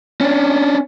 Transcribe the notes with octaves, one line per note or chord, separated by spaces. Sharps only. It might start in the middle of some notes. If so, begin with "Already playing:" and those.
C#4 D4